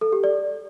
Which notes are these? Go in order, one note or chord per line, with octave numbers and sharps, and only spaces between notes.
A4
G4
D5